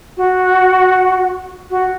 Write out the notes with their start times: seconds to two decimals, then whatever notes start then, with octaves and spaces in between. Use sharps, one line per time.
0.17 F#4
1.70 F#4